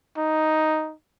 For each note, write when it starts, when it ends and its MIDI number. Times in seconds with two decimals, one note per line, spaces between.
0.18 0.94 63